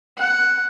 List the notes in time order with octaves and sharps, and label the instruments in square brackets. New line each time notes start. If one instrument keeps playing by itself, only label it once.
[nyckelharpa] F#5